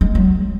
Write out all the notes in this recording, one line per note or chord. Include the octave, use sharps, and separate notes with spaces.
G#3
F#3